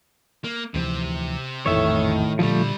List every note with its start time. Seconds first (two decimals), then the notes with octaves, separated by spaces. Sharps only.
0.44 A#3
0.74 D2 C3 E3 F3 C4
1.66 A#1 F2 A2 D#3 E3 C#5 E5
2.39 C2 A#2 D3 F3 G3 A3